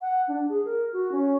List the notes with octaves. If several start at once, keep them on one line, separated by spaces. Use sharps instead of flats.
F#5
D4
G#4
A#4
F#4
C#4